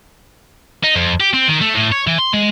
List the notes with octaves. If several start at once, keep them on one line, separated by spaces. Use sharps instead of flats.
D#4
F2
G4
C4
D#3
A3
A2
C#5
E3
C6
G#3